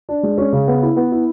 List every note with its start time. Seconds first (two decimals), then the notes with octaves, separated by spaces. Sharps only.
0.09 D4
0.23 G#3
0.38 C#4
0.53 C#3
0.68 B3
0.82 E4
0.96 B3
1.12 E4